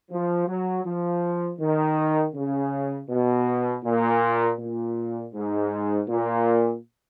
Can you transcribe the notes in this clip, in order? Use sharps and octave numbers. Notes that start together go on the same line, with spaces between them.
F3
F#3
F3
D#3
C#3
B2
A#2
A#2
G#2
A#2